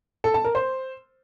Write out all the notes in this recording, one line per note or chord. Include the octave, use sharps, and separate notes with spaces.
A4
A5
A#4
C5